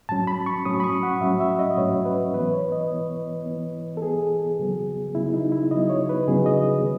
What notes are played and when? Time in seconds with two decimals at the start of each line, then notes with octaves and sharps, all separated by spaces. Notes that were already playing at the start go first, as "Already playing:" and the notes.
0.09 A2 F#3 C#4 A5
0.27 B5
0.46 C#6
0.65 A2 F#3 C#4 D#6
0.80 B5
0.84 C#6
1.03 F#5
1.21 A2 F#3 C#4 E5
1.40 E5
1.59 D#5
1.78 A2 F#3 C#4 C#5
2.05 B4
2.34 E3 B3 B4
2.53 C#5
2.72 D#5
2.91 E3 B3
3.46 E3 B3
3.97 A4
4.02 E3 B3 G#4
4.59 C#3 F#3 B3
5.15 C#3 F#3 B3 E4
5.33 D#4
5.52 E4
5.71 C#3 F#3 B3 D#5
5.90 C#5
6.09 B4
6.28 C#3 F#3 B3 G#4
6.46 D#5
6.83 D#3